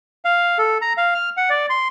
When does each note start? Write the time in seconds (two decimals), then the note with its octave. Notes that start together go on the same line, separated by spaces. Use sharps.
0.25 F5
0.58 A4
0.82 A#5
0.97 F5
1.14 F6
1.37 F#5
1.50 D5
1.70 C6